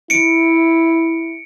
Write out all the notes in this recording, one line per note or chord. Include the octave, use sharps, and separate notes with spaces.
E4 C#7 D7